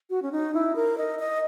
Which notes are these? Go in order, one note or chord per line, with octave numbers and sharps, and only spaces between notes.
F#4
C#4
D#4
E4
A#4
D#5
D#5